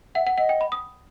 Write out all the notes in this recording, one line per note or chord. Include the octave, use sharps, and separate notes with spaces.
E5 F#5
F#5
D#5 F#5
G5
B5
D#6